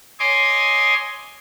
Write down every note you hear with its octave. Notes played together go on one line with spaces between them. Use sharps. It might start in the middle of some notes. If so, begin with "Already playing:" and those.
C#5 D#5 G#5 C6 D6